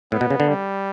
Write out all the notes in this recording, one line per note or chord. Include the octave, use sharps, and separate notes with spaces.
A2 B3
B2
C#3
D3
G3